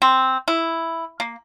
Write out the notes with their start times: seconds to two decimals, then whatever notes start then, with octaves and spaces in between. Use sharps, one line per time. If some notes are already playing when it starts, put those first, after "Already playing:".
0.02 C4
0.48 E4
1.20 A#3